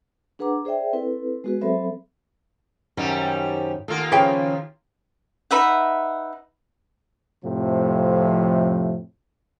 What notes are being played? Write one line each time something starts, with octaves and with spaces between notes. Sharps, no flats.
D4 G#4 B4 F#5 A#5 D6
G#4 C5 D5 E5 G5
C4 E4 A4 B4
G#3 B3 F#4 G#4 B4
F#3 C4 A4 C5 E5 B5
F#2 C3 D#3 G3 C#4 D#4
D#2 A#3 F4 A4 A#4
C#3 F3 C#4 G#4 B4 G5
D#4 B4 E5 F#5
F2 A2 C3 F3